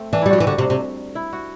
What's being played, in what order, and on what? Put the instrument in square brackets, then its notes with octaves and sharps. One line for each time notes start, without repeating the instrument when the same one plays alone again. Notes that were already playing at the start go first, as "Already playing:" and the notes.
Already playing: [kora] A3 C4
[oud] E3 [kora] D4
[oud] G3 [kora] E4
[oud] F#3 [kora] F#4
[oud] E3 [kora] G4
[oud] D3 [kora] F#4
[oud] C3
C3
[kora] E4
F#4